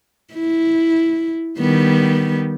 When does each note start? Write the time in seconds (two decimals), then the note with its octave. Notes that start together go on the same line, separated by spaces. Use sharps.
0.34 E4
1.59 D#3 G3 B3